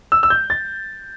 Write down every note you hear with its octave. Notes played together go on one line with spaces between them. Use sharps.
E6
E6
G6
A6